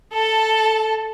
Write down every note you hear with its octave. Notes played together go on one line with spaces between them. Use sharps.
A4 A5